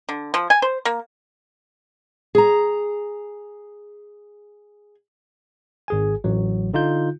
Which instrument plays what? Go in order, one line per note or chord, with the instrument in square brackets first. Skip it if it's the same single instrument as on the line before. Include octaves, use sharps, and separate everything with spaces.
[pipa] D3
F3
G#5
C5
A#3
[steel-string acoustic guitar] G#4 A#5
[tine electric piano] G#1 G#4 G#5
A1 F#3
D3 D#4 F4 G6